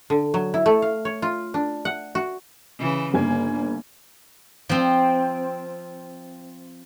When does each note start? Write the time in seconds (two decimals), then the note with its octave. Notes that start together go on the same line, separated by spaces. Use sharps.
0.10 D3
0.34 F#3
0.54 E4
0.66 A3
0.82 F5
1.05 C#5
1.22 F4
1.54 D4
1.85 F#5
2.15 F#4
2.79 C#3 E3
3.14 G1 A#3 G#5 G#6
4.69 F3 C4